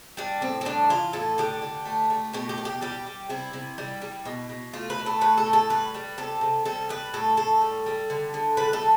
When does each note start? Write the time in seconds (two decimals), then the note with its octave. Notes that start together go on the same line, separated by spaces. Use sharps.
0.17 G3 D4
0.41 A2 C4
0.61 C4
0.65 G3 D4
0.90 E3 F4
1.13 A2 A4
1.38 D3 G4
1.62 D3
1.85 A3
2.10 A3
2.33 B2 G4
2.49 G4
2.58 B2
2.65 G4
2.81 G3 G4
3.06 G3
3.30 C3 E4
3.53 C3
3.78 G3
4.02 G3
4.25 B2
4.49 B2
4.73 A3 F4
4.90 B4
4.98 A3
5.06 A4
5.21 A2 B4
5.37 A4
5.46 A2
5.53 A4
5.70 G3 B4
5.94 G3
6.18 C3 A4
6.41 C3
6.65 G3 A4
6.89 G3 B4
7.14 A2 A4
7.37 A2 A4
7.61 G3
7.86 G3
8.10 D3
8.34 D3
8.57 G3 B4
8.73 A4
8.82 G3